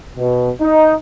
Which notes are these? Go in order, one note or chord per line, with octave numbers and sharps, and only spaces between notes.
B2
D#4